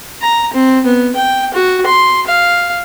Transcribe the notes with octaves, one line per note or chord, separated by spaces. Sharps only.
A#5
C4
B3
G5
F#4
C6
F5